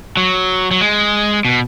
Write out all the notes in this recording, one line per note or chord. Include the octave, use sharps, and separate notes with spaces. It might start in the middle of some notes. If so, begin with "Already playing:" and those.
F#3
F#3
G#3
B2